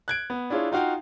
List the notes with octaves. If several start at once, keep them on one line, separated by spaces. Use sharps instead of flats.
F#6 G#6 D7
B3
D4 E4 F4 G#4 C#5
D#4 F4 F#4 F5 G5